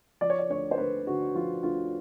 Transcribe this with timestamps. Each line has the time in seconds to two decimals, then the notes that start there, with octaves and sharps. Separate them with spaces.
0.21 F3 D5
0.30 C#5
0.39 D5
0.49 D2 C#5
0.71 C5
0.78 D2 B4
1.07 D3 F#4
1.35 F3 F4
1.63 D2 F4